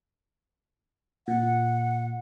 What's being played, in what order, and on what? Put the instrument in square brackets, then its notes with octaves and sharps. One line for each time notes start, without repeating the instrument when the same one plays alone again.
[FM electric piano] A#2 [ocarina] F#5